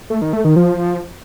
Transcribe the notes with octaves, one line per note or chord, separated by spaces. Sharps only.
A3
D#3
A3
D#3
F3